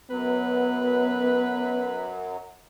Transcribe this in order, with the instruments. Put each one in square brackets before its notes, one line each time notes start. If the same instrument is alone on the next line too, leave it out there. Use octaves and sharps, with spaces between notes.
[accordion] F#2 F#3 [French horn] B3 [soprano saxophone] B4